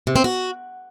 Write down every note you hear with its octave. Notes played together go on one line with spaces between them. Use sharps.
C3
C4
F#4